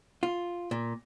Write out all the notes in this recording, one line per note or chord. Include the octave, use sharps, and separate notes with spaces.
F4
A#2